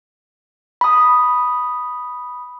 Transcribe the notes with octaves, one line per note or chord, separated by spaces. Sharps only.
B5 D#6